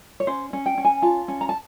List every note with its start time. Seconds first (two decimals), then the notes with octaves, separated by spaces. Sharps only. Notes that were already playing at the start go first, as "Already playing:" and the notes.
0.20 C#5
0.27 C#4 C5
0.53 C#4
0.66 G5
0.78 C#4
0.85 G#5
1.02 F4 A5
1.28 C#4
1.41 A#5
1.49 A5